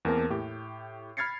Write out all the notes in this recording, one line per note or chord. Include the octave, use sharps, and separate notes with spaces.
E2 A#3 C4 A#4 A5
A2 G4
B5 F6 G#6 A6 C7 C#7